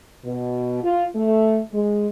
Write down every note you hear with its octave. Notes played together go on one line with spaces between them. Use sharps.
B2
F4
A3
G#3